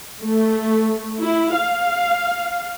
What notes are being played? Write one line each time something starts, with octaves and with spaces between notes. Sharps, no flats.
A3
E4
F5